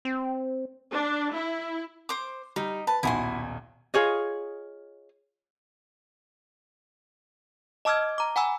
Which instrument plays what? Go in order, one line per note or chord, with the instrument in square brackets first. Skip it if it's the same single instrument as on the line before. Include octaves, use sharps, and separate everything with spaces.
[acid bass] C4
[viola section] D4
E4
[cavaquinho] C5 D6
[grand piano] G3 [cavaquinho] D#4
[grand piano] B4 [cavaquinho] A5
[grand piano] D#1 B1 G#5 [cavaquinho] E4 F#4 C6
[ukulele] F4 G#4 C#5 D#5
[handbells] D#5 A5 D6 E6 F6 G#6
A#5 D6
F#5 G#5 B5 E6